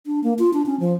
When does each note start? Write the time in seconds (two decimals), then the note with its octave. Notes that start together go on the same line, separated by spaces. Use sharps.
0.06 D4
0.24 A#3
0.39 F4
0.54 D4
0.66 C#4
0.80 F3